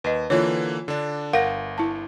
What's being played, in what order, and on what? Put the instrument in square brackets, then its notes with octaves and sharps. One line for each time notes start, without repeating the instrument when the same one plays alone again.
[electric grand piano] D#2 [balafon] B4 D#5
[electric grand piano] D3 E3 A#3 [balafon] F4 C#5
[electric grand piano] D3 D4
[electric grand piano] G1 A#6 [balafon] A#4 F5 F#5
[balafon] E4 A5